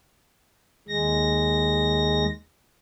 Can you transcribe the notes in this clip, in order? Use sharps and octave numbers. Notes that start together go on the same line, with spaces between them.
D#2 G#3 A#6